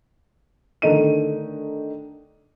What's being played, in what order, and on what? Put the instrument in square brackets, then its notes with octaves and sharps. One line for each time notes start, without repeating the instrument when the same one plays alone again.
[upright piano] D3 D#3 A3 D#4 D#7